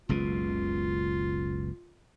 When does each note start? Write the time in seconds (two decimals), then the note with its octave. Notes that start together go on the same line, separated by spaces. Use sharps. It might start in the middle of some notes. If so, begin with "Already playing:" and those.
0.09 F#1 C#2 B2 F4